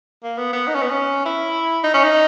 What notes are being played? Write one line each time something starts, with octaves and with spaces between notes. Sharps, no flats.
A#3
B3
B3
D#4
C#4
B3
C#4
E4
D#4
C#4
D#4